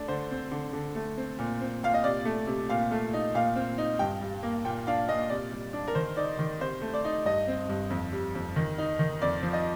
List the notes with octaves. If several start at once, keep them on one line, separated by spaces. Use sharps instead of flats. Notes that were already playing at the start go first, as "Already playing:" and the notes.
Already playing: A3 D4
D3 C5
C4
D3
D3
A3
C4
A#2
C4
A#2 F5
D#5
C3 D5
A3
C3
A#2 F5
A3
D#4
A#2 F5
C4
D#4
G2 G5
G3
A#3
A#2 G5
D4 F5
A#2 D#5
C3 D5
G3
D4
A#4
D#3 C5
D#4 D5
D#3
C3 C5
A3
D5
D#4
G2 D#5
C4
G2
F2
G3
F2
D#3
D#4
D#3
F2 D5
F3
D#5